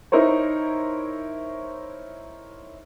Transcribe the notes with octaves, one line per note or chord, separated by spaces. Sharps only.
D#4 E4 A#4 C5 C#5